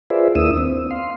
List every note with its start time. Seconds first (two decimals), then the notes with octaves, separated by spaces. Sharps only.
0.10 F4 G#4 B4 C5 D5 E5
0.35 D#2 A#3 D4 E4 D#6 E6
0.58 C4
0.91 F5 C6